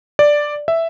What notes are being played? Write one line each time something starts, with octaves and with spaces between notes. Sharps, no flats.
D5
E5